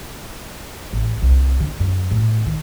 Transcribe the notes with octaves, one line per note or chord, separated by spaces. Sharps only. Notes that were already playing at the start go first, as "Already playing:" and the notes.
A1
C2
D3
F#2
A2
D#3